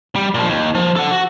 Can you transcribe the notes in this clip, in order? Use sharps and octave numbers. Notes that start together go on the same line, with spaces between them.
G3
A#2 F3
D#2
F3
A4 F#5
F#4